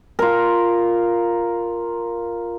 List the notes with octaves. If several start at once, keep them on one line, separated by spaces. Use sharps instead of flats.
F4 A#4